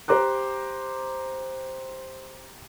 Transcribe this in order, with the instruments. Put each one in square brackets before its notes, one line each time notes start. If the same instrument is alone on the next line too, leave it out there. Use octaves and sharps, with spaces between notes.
[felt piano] G4 C5 A#5 D6 F#6